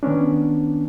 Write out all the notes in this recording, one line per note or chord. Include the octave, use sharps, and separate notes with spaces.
D#3 B3 C#4 D4